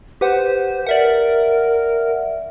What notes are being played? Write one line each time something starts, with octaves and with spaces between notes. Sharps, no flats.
G4 B4 C5 F#5
A#4 D5 E5 F#5